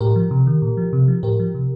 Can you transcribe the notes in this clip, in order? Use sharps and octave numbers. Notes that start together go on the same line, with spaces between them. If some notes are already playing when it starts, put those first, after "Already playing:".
A2 G4 A#4
F3
C3
D#3
A#2
F3
C3
F3
A2 G4 A#4
F3
C3